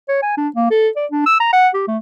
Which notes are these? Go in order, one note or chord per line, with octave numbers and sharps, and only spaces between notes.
C#5
G#5
D4
A#3
A4
D5
D4
E6
A#5
F#5
G4
A3